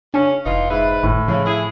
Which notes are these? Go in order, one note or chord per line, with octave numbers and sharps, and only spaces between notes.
C#3 C#4 D4 G#5
F1 E3 D#4 F4
G#2 B4 E5
G#1 A2
C#3 F3
E4 G#4